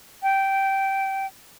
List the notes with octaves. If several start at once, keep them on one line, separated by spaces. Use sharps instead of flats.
G5